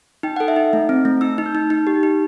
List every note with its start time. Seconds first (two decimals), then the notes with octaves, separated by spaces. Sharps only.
0.23 D#4 G5
0.36 A4 F#5
0.48 E5
0.56 D#4
0.73 A3
0.89 C4
1.05 A3
1.21 D#4 E6
1.38 D#4
1.46 G6
1.55 D#4
1.70 D#4
1.87 G4
2.03 D#4